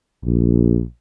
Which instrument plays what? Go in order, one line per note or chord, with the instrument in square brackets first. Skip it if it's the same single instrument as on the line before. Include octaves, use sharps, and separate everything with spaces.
[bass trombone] A#1